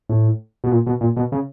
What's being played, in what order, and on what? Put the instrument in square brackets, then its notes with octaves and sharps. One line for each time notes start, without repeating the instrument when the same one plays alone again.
[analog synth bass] A2
B2
A#2
B2
A#2
B2
C#3